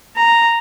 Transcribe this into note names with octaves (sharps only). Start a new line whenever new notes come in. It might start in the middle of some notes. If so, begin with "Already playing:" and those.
A#5